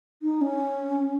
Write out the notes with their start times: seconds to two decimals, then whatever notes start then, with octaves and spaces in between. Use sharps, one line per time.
0.22 D#4
0.41 C#4